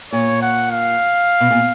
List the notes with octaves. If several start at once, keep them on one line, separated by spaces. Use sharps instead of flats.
A#2 C#5
F#5
F5
B2
A#2